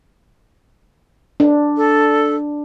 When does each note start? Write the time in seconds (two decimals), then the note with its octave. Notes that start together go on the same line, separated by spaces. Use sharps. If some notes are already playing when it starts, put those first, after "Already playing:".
1.40 D4
1.77 A4